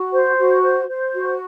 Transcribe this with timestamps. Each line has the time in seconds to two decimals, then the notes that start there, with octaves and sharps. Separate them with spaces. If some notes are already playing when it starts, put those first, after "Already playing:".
Already playing: F#4
0.12 C5
0.37 F#4
0.62 C5
0.88 C5
1.13 F#4